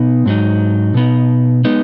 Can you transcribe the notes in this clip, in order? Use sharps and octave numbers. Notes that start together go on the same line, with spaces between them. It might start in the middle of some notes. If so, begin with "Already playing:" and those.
Already playing: B2 B3 D#4
G#2 F#3 D#4
B2 B3 D#4
G#3 B3 D#4